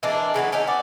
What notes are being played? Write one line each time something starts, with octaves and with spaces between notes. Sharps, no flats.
E3 G#3 A#3 D4
C#3 E3 F#3 B3
E3 C#4 D#4 E4
B3 F#4 D5